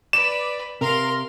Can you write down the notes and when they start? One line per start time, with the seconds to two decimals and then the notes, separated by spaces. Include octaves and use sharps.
0.13 B4 D5 E7
0.81 C3 A#4 F5 C6